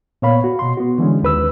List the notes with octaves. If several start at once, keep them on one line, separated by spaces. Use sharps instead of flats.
A#2 B3 C#5 F5 B5
F#4
B2 C6
B3 F#4
D3 E3 G#3 C#4
D#2 B4 E6